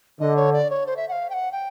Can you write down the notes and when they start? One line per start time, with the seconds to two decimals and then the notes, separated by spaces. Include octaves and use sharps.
0.20 D3 D#5
0.36 C#5
0.53 D5
0.70 C#5
0.86 C5
0.97 E5
1.08 F#5
1.12 F5
1.30 G5
1.34 F#5
1.52 G5